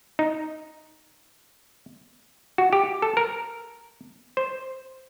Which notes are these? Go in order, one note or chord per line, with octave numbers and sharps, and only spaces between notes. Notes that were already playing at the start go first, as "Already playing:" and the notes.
D#4
F#4
G4
A4
A#4
C5